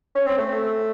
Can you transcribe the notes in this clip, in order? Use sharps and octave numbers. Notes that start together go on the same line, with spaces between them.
C#4
C4
A3